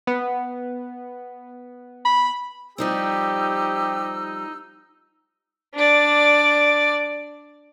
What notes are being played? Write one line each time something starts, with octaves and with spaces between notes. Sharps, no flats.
B3
B5
F3 G3 C4 D#4 G4 E6
D4 D5